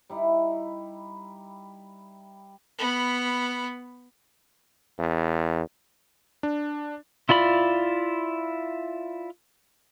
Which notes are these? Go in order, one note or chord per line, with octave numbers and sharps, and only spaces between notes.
G3 D#4 E4
B3 B5
E2
D4
E4 F4 D5 B5